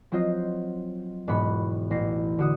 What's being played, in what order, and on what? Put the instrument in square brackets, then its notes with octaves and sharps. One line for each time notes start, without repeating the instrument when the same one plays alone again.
[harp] F3 F#3 C4 F4 C5 D#5
E1 G#2 B3 B5 C#6
A1 A#6 C7
D3 F#4 D#6